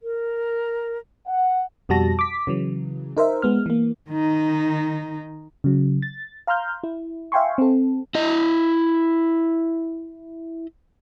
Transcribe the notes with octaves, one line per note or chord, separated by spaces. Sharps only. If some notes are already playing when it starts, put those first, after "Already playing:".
A#4
F#5
F2 B2 G3 F#4 A5 A#6
D6 B6
C#3 E3 F#3
D#4 A#4 C5 E5
G#3 B3 F6
E3 A#3
D#3 D#4
C#3 F#3
A6
F5 A#5 C6 F6 G6
E4
E5 F5 G5 G#5 C6 C#6
C4 A4
E4 D#5